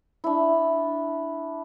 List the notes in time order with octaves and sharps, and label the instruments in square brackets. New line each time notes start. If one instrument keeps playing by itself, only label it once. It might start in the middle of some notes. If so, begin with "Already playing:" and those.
[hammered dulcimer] D4 E4